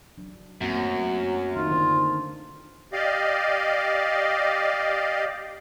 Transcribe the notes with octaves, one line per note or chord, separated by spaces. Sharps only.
F#3 D4
F#2 F#3 A3 A#3 C4
D#3 D#4 F4 A#4
D3 D4 C5
G4 D5 D#5 F5